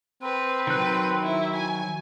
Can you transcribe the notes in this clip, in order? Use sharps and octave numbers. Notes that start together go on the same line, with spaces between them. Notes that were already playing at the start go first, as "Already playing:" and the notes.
C4 B4
D#3 F#3 B4 F#6
E4
G#5